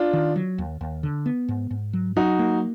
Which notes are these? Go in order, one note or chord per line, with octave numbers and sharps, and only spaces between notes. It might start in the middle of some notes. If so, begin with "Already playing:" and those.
Already playing: D4 F4
D#3
F#3
D#2
D#2
D3
B3
G#2
G#2
F#3
F#3 D#4 F#4
A#3